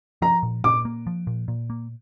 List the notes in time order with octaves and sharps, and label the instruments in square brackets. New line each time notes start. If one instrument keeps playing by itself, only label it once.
[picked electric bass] F3 [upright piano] A#5
[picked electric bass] A#2
[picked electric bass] A#2 [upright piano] D6
[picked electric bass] A#3
F3
A#2
A#2
A#3